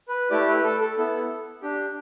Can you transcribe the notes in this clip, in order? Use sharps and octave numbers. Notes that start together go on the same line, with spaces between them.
B4
A3 E4 G4 D5
B4
A4
A4
B3 E4 A4
D4 G4